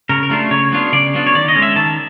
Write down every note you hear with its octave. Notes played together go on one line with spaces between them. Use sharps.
C#3 A#4
A#4
F#3 A3 D4 F4
C#3 C#5
F#3 B3 D4 F4
C#3 D5
F#3 B3 D4 F4
C#5
D#3 D5
D#5
G#3 C#4
E5
D#3 A5